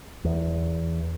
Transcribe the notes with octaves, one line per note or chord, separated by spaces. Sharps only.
E2